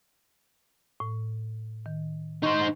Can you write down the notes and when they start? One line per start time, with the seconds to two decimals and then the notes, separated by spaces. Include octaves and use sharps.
1.00 A2
1.86 D#3
2.43 D#4 C5 C#6